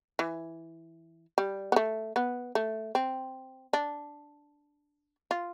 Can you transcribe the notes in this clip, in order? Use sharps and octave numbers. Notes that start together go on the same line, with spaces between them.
E3
G3
B3
A3
B3
A3
C4
D4
F4